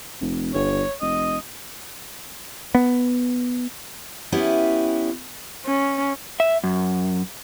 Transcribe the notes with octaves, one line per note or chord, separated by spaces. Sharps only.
F1
G1 C#5
F1 D#5
B3
B3 C#4 E4 G4
C#4
E5
F#2